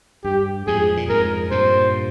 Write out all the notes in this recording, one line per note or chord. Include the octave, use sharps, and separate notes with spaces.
G2 G4
F2 G#2 G#4
A#2
F2 G#2 A#4
G2 A#2 C5